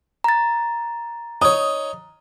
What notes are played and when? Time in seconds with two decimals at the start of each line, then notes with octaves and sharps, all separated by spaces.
0.24 A#5 A6
1.42 D#4 C#5 D#6